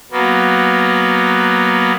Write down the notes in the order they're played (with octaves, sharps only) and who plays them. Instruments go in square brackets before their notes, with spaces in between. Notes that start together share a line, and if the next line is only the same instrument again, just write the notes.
[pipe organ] F#3 A#3 B3